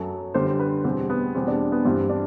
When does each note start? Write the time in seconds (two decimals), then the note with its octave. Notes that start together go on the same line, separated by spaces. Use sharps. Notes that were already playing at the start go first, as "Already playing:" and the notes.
Already playing: F#2 F#3 A4
0.34 F#2 D3 G3 C5
0.60 B4
0.84 E2 B2 G3 C4
1.10 B3
1.34 E2 B2 G3 C4
1.48 D4
1.72 B3
1.85 G2 E3 G3 C4
2.10 D4